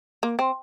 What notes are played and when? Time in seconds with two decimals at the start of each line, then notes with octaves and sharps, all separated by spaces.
0.23 A#3
0.39 C4